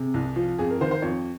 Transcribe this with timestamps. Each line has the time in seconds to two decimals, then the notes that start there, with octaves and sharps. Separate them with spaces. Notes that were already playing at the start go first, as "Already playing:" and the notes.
Already playing: C3 G#4
0.14 C2
0.36 F3
0.59 F2 G#4
0.70 A#4
0.81 D#3 C5
0.91 C5
1.02 F2 C#5